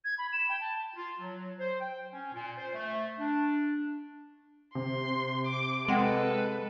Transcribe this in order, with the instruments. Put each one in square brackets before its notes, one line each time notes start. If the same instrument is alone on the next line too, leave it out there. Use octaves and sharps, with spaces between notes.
[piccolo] G#6
B5
E7
G5
A5
[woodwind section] F4
F#3
C5
G5
C#4
A#2
C5
A3
D4
[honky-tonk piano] C3 [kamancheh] C6
[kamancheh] D6
[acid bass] G#3 [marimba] C4 F#5 G5 [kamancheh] A4 B4